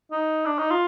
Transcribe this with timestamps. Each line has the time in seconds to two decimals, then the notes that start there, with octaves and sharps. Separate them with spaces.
0.11 D#4
0.46 D4
0.59 D#4
0.71 F4